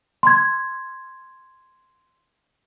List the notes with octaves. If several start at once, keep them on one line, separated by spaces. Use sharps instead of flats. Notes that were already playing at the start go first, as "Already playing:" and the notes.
C6 G#6